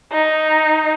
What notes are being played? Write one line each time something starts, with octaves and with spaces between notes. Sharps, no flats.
D#4